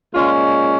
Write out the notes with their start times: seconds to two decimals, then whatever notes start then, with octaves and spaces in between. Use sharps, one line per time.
0.14 A#2 G#3 C#4 F4